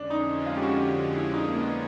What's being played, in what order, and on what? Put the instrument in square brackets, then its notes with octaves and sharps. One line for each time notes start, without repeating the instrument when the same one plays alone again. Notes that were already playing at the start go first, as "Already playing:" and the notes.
Already playing: [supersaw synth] F2 D3 F3 G#3 C#4 [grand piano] D4
[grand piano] D#4
F4
G4
F#4
G4
E4
D#4
A#3
B3